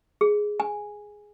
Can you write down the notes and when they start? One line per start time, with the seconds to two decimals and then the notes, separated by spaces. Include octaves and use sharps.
0.21 G#4
0.60 G#5